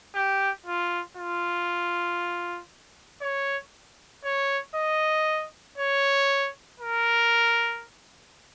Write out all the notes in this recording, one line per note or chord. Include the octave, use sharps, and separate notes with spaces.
G4
F4
F4
C#5
C#5
D#5
C#5
A#4